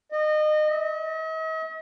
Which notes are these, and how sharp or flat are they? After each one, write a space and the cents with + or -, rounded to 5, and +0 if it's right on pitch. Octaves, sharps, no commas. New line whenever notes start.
D#5 -25
D#5 +45